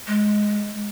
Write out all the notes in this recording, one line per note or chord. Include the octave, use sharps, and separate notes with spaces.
G#3